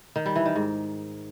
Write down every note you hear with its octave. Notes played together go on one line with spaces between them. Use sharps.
D#3
G3
E3
D#3
G#2